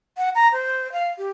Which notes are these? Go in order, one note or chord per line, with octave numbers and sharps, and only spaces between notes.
F#5
A#5
C5
F5
G4